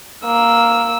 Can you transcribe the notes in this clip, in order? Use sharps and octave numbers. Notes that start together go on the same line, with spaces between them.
A#3 E6